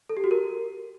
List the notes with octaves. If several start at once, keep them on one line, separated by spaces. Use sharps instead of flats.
A4
G4
F#4
A#4